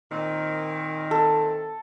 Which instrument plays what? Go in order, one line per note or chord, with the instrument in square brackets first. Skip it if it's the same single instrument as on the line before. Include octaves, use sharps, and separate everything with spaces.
[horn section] A#2 D#3 C4
[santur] A4